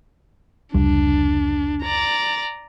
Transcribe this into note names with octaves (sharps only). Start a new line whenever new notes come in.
F1 C#2 G3 D4
D5 A#5